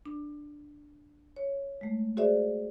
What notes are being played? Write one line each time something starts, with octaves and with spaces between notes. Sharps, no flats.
D4
C#5
G#3 A3
F#4 G#4 C5 D5 E5